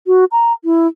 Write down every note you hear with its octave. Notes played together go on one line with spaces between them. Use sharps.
F#4
A#5
E4